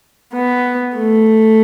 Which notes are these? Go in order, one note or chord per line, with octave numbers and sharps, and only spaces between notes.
B3
A3